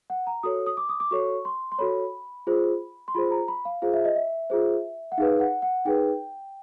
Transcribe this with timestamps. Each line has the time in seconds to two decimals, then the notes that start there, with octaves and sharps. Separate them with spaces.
0.10 F#5
0.27 A#5
0.43 F#4 A4 C#5 D#6
0.66 D#6
0.77 D6
0.89 D#6
1.00 D6
1.11 F#4 A4 C#5 C#6
1.45 C6
1.72 C6
1.79 F#4 A4 C#5 B5
2.47 F4 G#4 C5
3.08 C6
3.14 F4 G#4 C5 B5
3.31 A#5
3.48 B5
3.65 F5
3.82 F4 G#4 C5 F5
3.93 E5
4.05 D#5
4.16 E5
4.50 F4 G#4 C5
5.12 F#5
5.18 D#4 G#4 B4 F5
5.40 F#5
5.62 F#5
5.85 D#4 G#4 B4 G5